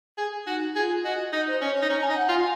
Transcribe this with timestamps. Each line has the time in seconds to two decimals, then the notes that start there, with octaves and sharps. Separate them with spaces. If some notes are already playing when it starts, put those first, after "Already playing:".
0.18 G#4
0.46 D#4 F#4
0.75 F4 G#4
1.04 F#4 D#5
1.33 D#4 D#5
1.47 C5
1.61 C#4 C#5
1.76 C#5
1.82 D#4
1.89 C#4 A#5
2.03 G#5
2.10 D#4
2.16 F#5
2.29 F4 G#5